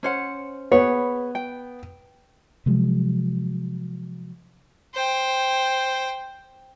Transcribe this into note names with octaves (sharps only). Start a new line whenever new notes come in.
C#4 C5 F#5
B3 G#4 B4 C#5
G5
C3 F3 F#3 G#3
C5 G5